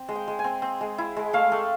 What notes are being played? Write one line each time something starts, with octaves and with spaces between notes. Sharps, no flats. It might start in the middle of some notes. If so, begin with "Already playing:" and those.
Already playing: C4
G#3
G5
G#3
G#5
C4
C4
G#3
E4
G#3
A3 F5
A3